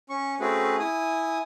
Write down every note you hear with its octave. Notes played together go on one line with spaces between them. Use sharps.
C#4 C#6
A3 C4 C#4 F#4 G#4 B4
E4 G#5 D#6